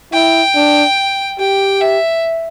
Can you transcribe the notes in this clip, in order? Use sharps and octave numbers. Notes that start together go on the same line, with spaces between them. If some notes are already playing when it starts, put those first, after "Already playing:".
E4 G5
D4
G4 G5
E5